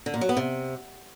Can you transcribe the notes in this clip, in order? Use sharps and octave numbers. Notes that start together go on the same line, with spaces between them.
D3
A#2
F#3
B3
C3